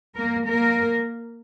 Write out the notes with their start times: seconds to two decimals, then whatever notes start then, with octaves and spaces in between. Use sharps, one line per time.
0.16 A#3 A#4
0.47 A#3 A#4